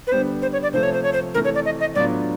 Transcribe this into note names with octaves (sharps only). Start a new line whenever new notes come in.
B4
D3 G3 B3 C5
C5
C#5
D5
C3 F3 A3 C5
C#5
C5
C#5
C5
C3 E3 A3 A#4
C#5
D5
D#5
D#5
A2 F#3 B3 D4 F4 D5